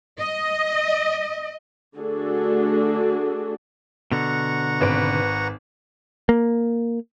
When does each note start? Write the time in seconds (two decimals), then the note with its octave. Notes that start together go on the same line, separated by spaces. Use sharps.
0.19 D#5
1.96 D3 A3 D4 F#4 G#4 A4
4.12 B2 D3 F#5 A#5 C#6
4.81 G#1 B4 D7
6.29 A#3